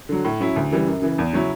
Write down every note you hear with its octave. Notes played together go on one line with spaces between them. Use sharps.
D3 F#3
A2
F#3 C#4 E4
D2
C#3 E3 G3
F#2
C#3 E3
E2
C#3 F#3 C#4 E4